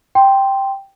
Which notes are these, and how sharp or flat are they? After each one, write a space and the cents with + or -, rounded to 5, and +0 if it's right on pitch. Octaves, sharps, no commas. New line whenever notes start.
G5 +0 C6 +0